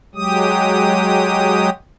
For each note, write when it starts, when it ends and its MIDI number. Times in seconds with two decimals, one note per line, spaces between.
0.15 1.69 54
0.15 1.69 56
0.15 1.69 67
0.15 1.69 87